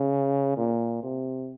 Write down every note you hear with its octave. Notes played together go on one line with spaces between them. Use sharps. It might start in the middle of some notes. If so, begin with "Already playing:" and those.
Already playing: C#3
A#2
C3